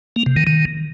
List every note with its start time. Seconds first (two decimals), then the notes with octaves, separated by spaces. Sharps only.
0.16 A#3
0.26 C3
0.36 D#3
0.47 D#3